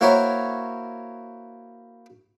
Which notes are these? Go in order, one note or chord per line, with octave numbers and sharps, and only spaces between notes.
A#3 E4 F#4 A#4 C5 C#5